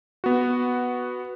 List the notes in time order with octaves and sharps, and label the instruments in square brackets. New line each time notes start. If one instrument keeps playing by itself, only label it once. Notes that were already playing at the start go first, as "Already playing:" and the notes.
[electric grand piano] B3 F#4